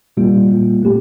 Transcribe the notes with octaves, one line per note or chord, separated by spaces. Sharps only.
A#2 G3 A#3 F4
A#2 G3 A#3 F4
A#2 A3 C4 G4